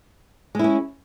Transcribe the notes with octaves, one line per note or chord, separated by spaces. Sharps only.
G#3 C#4 E4